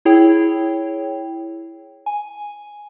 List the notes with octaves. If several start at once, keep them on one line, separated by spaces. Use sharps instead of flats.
E4 G#4 C#5 G5
G#5